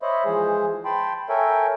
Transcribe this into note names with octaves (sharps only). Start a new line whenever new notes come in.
C5 C#5 D#5 E5 B5
E3 F3 G#3 G#4 C5
G5 A5 B5 C6
A4 A#4 C#5 E5 G5 G#5